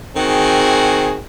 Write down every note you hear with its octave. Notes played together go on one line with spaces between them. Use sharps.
D#3 C4 F#4 G#4